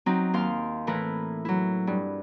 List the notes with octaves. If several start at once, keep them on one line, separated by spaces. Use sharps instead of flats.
F#3 C4 D#4
D#2 F5 C6
A2 E3 A#4 B4
F#3 E4
G2